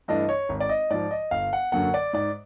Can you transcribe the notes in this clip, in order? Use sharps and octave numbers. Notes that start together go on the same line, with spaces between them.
G2 E3 A3 D4 D#5
C#5
G#1
D5
D#5
G#2 F3 D5
D#5
G1 F5
F#5
F#2 D3 F#3 A#3 F#5
D5
G#2 D5